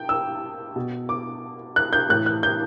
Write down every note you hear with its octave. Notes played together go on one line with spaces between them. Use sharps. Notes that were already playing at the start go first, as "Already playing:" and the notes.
Already playing: G5
E6
B2
D6
F#6
G6
A2 E3 F#6
F#6
G6